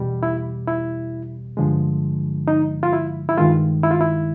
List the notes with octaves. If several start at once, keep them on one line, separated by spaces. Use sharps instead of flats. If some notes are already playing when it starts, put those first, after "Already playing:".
Already playing: E2 B2 G3
E4
E4
G2 D3 F3 G#3
D#4
F4
E4
E4
G2 D#3 G#3 F4
E4
F4
E4